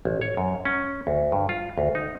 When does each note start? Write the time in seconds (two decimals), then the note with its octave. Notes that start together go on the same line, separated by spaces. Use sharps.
0.05 A1
0.21 C#5
0.37 F#2
0.65 C#4
1.07 D2
1.32 G2
1.49 F4
1.78 D2
1.95 D#4